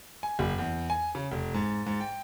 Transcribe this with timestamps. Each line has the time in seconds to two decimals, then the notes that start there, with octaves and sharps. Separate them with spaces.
0.23 G#5
0.39 F#1
0.58 E2
0.90 G#5
1.15 C#3
1.32 F1
1.54 G#2
1.86 G#2
2.01 G5